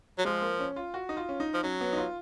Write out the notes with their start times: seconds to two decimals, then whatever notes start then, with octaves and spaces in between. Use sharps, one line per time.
0.18 F#3
0.25 F3 G#3
0.42 A#3
0.59 C#4
0.76 F4
0.94 F#4
1.09 D#4
1.17 F4
1.29 C#4
1.40 D#4
1.54 F3
1.63 F#3 C#4
1.81 B3
1.93 D#4
1.97 F4